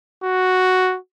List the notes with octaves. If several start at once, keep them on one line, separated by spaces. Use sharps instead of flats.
F#4